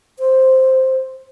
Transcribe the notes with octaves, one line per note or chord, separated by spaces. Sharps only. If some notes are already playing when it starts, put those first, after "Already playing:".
C5